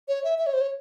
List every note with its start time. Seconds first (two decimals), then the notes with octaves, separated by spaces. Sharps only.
0.08 C#5
0.24 E5
0.38 E5
0.46 C#5
0.53 C5
0.61 C#5